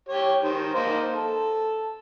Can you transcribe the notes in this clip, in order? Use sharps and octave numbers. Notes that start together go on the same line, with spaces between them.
G4 C#5
D#3 C5
A#3 D#4 C5
A4